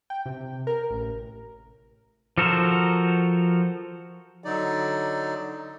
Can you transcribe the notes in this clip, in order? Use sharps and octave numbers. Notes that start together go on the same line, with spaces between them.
G5
C3
A#4
A1
F3 F#4 A4 A#4 C5
D3 F#3 D#4 D5